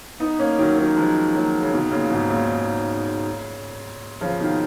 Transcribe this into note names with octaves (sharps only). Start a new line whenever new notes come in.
B3 D#4
A#3 C#4
D#3 F#3
D#3 F#3
F3 G#3
F#3 A#3
C#3
B2 D#3
A#2 C#3
G#2 B2
A#2 C#3
C#3 F3
B2 D#3